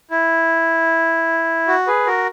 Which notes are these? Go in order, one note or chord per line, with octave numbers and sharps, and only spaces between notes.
E4
F#4
G#4 B4
F#4 A#4